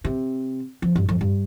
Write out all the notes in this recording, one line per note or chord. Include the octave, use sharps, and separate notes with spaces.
C3
F3
G2
F2
G2